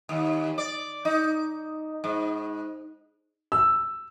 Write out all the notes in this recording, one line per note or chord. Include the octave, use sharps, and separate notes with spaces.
D#2
D5
D#4
G#2
E6